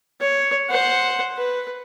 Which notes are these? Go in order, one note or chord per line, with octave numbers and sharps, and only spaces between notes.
C#5
C5 F#5
B4